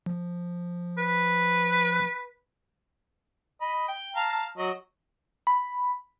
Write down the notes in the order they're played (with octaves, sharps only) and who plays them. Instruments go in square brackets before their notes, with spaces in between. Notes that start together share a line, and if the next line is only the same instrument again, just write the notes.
[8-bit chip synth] F3
[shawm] B4
[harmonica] D#5 B5
G5
F5 A5 A#5
F#3 D#5
[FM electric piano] B5